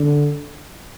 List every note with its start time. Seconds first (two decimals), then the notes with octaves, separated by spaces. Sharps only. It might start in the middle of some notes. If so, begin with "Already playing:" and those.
Already playing: D3